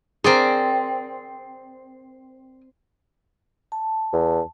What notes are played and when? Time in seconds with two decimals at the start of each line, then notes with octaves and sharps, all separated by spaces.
0.24 C4 G#4 A#4 D5 C6
3.72 A5
4.13 E2